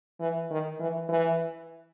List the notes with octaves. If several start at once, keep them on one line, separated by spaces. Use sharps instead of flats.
E3
D#3
E3
E3